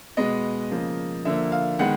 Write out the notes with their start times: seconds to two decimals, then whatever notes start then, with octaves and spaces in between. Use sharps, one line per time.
0.17 B2 G#3 B3 D#5
0.71 C#3 F3 A#3
1.25 D3 F3 A#3 E5
1.52 F5
1.79 D#3 G#3 B3 F#5